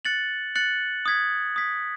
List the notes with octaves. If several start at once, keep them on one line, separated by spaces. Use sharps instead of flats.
F#6 A6 C#7 F#7
F#6 A6 C#7 F#7
D#6 G#6 B6
D#6 G#6 B6